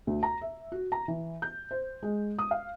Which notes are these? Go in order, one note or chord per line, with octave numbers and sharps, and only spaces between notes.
D2
A#5
E5
F#4
A#5
E3
G6
C5
G#3
D#6
F5